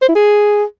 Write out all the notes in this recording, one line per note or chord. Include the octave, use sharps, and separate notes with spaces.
C5
E4
G#4